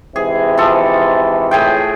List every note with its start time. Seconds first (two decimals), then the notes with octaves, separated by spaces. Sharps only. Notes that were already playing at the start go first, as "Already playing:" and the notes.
0.16 G#2 C3 E3 G#4
0.57 F3 A4
1.51 A2 G#4 G5